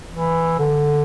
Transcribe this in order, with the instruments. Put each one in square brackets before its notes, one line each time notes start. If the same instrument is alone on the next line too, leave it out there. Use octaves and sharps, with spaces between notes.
[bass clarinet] E3
D3